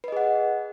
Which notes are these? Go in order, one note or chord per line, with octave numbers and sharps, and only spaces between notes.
G#4 B4 D#5 F#5